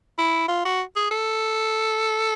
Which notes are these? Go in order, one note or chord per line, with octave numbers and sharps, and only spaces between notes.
E4
F4
F#4
G#4
A4